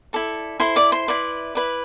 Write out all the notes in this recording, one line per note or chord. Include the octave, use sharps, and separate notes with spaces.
E4 A4 D5
E4 A4 C5 C6
D5 D6
C5 C6
E4 B4 D5
E4 B4 D5